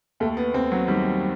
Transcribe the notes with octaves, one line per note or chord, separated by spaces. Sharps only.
D#2 A3
B3
D#2 C4
F#3
D#3 G3